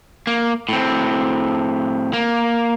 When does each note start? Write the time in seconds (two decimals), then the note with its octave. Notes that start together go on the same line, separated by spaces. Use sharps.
0.27 A#3
0.69 A2 C4
2.13 A#3